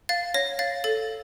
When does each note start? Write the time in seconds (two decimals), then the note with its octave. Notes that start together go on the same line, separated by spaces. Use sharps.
0.09 F5 A6
0.34 C#5 A#6
0.59 F5 A6
0.84 A4 A6